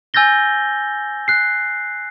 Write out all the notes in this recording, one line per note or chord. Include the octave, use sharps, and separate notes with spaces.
G#5 E6 G6 A6 A#6 G7
F#6 C7